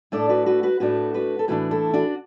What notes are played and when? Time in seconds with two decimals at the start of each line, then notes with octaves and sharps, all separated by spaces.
0.12 A2 A3 D4 A4 D5
0.29 F#4 B4
0.46 F#4 B4
0.63 F#4 B4
0.80 A2 A3 D4 F#4 B4
1.14 F#4 B4
1.39 A4
1.48 A2 E3 D4 F#4 B4
1.71 E4 A4
1.93 D4 F#4